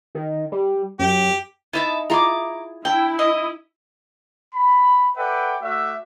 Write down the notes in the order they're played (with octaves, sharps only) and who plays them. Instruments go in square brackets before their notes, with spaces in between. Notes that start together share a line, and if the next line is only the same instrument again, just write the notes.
[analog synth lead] D#3
G3
[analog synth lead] F#2 [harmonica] G4
[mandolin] B3 E5 A5 [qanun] D#4 E4
[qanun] E4 F4 G#4 [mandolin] A#5 C6 D6
[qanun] D4 [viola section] E4 [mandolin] G5
[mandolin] D#5
[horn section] B5
A4 B4 D5 E5 F#5 G5
A3 F#4 D5 E5